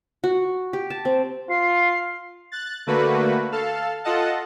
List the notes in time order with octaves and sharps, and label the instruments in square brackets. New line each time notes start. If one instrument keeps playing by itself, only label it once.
[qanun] F#4
G4
A5
C4
[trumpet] F4 [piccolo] C7
[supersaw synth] F#6 A6
D3 A3 A#3 F#4 B4
A4 F5 A5
F4 A4 D#5 F#5 A5